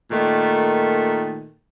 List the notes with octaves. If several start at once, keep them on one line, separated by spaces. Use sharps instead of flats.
A#2 D#3 A3